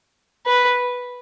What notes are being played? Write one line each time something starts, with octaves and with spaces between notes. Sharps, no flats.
B4